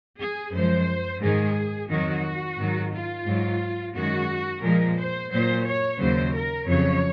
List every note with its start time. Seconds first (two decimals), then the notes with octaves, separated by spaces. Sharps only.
0.19 G#4
0.53 F#2 F3 G#3 C5
1.21 G#2 D#3 G#3 G#4
1.89 F2 D#3 F#3 F#4
2.58 G#2 D#3 F#3
2.92 F4
3.26 G#2 F#3
3.94 F#2 D#3 G#3 F#4
4.62 A#2 F3 G#3 A#4
4.97 C5
5.31 A#2 F#3 C5
5.64 C#5
5.99 D#2 C#3 F#3 C5
6.33 A#4
6.67 F2 C#3 F#3 C#5